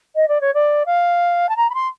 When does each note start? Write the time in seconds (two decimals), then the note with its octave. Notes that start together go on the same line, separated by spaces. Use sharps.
0.16 D#5
0.28 D5
0.41 C#5
0.54 D5
0.86 F5
1.49 A5
1.57 A#5
1.70 B5
1.74 C6